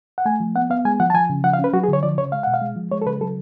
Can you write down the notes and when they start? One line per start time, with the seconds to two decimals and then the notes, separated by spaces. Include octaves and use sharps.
0.18 F#5
0.26 A3 G#5
0.40 F3
0.56 B3 F#5
0.70 B3 F5
0.85 G#3 G#5
1.00 F3 F#5
1.10 A5
1.14 F3 G#5
1.30 C#3
1.44 F3 F#5
1.54 F5
1.59 C#4
1.64 B4
1.73 F#3 F#4
1.83 G#4
1.88 D3 C#5
2.03 F3 D5
2.18 C#3 C#5
2.32 G#3 F5
2.43 B2 F#5
2.54 F5
2.62 G#3
2.76 F3
2.91 G#3 C#5
3.02 A4
3.06 C#3 B4
3.21 F#3 A4